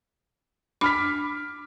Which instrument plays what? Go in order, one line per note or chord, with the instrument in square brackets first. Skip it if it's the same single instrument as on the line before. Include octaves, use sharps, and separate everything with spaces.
[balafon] D4 B5 [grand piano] D6 F6 B6